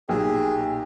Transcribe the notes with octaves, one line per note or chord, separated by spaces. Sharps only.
B1 A#2 F#3 G4 G#4